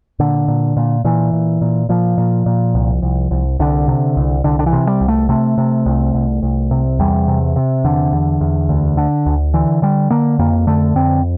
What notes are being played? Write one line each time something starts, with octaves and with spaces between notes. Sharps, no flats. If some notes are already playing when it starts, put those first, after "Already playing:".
A#2 D3
A#2
A#2
A#2 E3
A#2
A#2
A#2 F3
A#2
A#2
C2
C2
C2
C2 D3
C3
C2
C2 D3
D3
E3
C3
G3
C2
A3
C3 A3
C3
C2
C2
C2
C3
E2 G3
C3
C3
E2 D3
E2
E2
D2
D3
D2
D3 E3
D3 G3
D3 A#3
F2 A#3
D3 A3
F2 C4